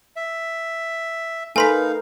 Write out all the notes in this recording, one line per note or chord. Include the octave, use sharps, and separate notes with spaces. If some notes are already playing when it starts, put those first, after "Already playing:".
E5
A3 D#4 A#4 B4 F5 G#5 C6 B6